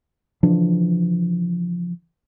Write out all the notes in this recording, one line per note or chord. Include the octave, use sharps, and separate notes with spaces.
C#3 E3 F3 D4